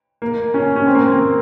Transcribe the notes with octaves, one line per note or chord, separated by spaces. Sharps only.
A#3
C#4
C#4
C4
A#3
C4
A#3